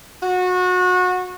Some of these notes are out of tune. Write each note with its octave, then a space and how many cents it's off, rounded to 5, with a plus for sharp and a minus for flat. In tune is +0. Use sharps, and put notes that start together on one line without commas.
F#4 -25